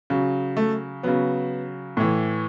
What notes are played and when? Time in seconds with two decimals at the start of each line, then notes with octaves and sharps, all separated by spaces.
0.10 C#3 F#3
0.57 A3
1.03 C#3 F#3 B3
1.97 A2 E3